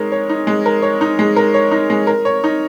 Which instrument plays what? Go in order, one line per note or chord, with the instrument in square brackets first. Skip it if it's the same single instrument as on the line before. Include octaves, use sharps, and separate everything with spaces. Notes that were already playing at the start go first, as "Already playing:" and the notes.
Already playing: [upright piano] G#3 D#4 A#4 C#5
C#5
D#4
G#3
A#4
C#5
D#4
G#3
A#4
C#5
D#4
G#3
A#4
C#5
D#4